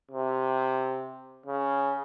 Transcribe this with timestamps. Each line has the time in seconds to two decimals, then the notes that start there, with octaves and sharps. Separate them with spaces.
0.11 C3
1.46 C#3